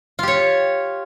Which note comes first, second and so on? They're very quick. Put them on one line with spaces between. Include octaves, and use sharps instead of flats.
F4 G4 C#5